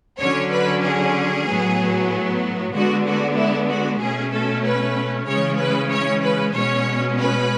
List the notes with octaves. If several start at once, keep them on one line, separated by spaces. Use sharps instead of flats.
D3 F#3 C#4 C#5
B4
G#4
A2 F#3 B3
D3 G#3 B3 F#4
F#4
E4
F#4
B2 A3 C#4 G#4
A4
B4
C#3 E3 G#3 C#4 C#5
B4
C#5
B4
B2 G#3 C#4 C#5
B4